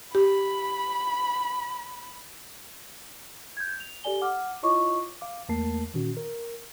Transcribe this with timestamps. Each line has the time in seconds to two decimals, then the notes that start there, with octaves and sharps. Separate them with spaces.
0.15 G4 B5
3.57 G6 G#6
3.80 F7
4.04 G4 A4 D5 G#5 G7
4.21 F#5 D6 F6
4.63 E4 F4 C#5 D#5 C#6 D6
5.21 F5 D6
5.49 E2 A3 A#3 A#4 A5 C7
5.94 A#2 D#3 C#4 F#4
6.17 A#4